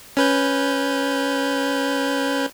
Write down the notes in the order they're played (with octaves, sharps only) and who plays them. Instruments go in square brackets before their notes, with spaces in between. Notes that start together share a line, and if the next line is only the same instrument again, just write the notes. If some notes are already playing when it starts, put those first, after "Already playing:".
[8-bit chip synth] C#4 B4 G6